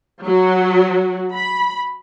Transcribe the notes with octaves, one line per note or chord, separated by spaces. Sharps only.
F#3 F#4
B5